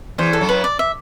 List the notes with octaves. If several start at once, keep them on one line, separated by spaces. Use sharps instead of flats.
E2 E3 C5
A4
F#2 F#3
B4
D5
E5